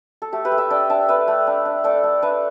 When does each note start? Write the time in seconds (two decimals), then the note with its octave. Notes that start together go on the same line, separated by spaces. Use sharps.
0.22 A4
0.32 A3 G4
0.45 G4 B4
0.52 A3
0.57 E5 A5
0.70 D4 D5 G5
0.89 D4 E5 A5
1.09 A3 B4 E5
1.28 A3
1.47 D4
1.65 D4
1.84 A3 A4 D5
2.04 A3
2.22 D4 B4 E5